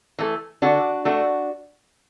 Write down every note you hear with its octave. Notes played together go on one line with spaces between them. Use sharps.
E3 A3
D3 D4 F#4
A3 D4 F#4